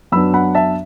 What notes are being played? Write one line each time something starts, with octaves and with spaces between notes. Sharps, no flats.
F#2 F#3 B3 D4 B5 E6
F#5 B5
E5 A5